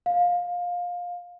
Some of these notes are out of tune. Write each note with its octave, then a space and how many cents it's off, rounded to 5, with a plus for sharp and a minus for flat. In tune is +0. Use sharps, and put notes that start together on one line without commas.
F5 +20